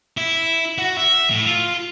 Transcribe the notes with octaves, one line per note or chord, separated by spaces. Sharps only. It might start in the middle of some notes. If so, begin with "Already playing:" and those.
E4
F#4
E5
A2
F4